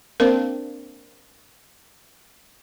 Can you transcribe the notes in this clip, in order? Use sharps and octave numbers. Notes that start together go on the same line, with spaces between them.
A#3 C4 D4 A#4 C5